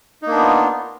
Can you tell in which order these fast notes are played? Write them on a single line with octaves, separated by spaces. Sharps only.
D#4 A#3 D4 B3 F4